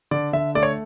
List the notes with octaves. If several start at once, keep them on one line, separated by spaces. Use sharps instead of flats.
D3 D5
D3 E5
A3 D5
C#5